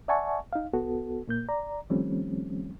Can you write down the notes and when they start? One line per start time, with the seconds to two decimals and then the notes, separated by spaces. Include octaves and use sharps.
0.08 D5 E5 F#5 G#5 A5 C#6
0.53 D#4 F5
0.73 C2 B3 F#4 A4
1.28 A#2 A#3 G6
1.49 D5 A#5
1.90 D#3 F3 G3 A3 C4 C#4